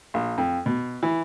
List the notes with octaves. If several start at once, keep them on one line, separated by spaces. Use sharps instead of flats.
A#1
F2
B2
E3